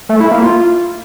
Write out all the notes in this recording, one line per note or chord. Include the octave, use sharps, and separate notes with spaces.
A3
E4
A#3
F4